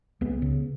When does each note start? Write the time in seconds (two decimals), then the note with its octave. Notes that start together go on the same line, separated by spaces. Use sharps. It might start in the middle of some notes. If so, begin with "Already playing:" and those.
0.21 C#2 B3
0.42 C#3